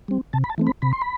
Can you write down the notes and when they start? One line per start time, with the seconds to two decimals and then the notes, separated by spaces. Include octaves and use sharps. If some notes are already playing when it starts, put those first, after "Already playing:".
0.08 G3 C4
0.33 C3 A5
0.44 B5
0.50 A5
0.58 E3 A3 C4
0.67 B5
0.82 C3 B5
0.93 C6
1.02 B5